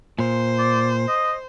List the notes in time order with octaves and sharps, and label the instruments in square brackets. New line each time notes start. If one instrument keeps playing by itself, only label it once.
[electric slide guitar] A#2 [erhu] C5
[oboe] D5
D#5